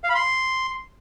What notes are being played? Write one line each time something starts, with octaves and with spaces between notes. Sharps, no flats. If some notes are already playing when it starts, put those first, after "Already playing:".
F5
B5
C6